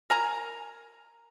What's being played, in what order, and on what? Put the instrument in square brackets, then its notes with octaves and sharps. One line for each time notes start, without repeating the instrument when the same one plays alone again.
[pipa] A#4 G#5 A#5